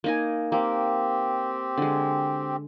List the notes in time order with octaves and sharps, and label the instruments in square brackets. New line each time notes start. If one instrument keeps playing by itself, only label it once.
[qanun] A#3 D#4 G#5
[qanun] A#3 [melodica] C4 G4
[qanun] D3 G#3